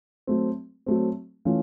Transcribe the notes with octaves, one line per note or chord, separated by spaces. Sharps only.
F#3 A3 C4
F#3 A3 C4
E3 A3 C#4 F4